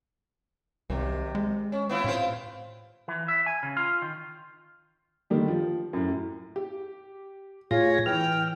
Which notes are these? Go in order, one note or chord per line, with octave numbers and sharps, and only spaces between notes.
C2 F#2 C3 D#3
G#3
C#4
B3 E4 F4
A2 C4 F4 C5
E3
E5
G#5
C#3
F4
D#3
D3 D#3 G3 G4
F3
F#2 A2
G4
A2 F4 G#4 C#5 A#6
E3 G5 F6